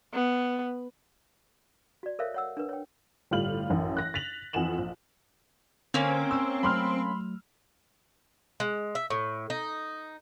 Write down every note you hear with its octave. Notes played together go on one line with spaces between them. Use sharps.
B3
F#4 D5
A4 A#4 C5 C#5 E5 F5
C#5 F#5 E6
D4 A#4 B4
C#5 G5
G1 A2 G3 F4 F6 F#7
A1 F#2
F#6 A#6
A6 B6 F7 F#7
F2 E3 F#5 G#5 E7 F#7
A#1
D3 A#3 C4 C#4
C#5 G5 C#6 E6
F#3 A3 B5 C6 F6
G#3
E5
A2
D#4